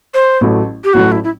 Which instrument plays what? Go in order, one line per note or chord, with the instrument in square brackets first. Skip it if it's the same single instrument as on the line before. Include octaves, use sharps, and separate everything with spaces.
[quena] C5
[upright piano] A1 A2 F#3 A3
[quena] G4
[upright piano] A1 A2 F#3 A3 [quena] F#4
[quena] E4
E4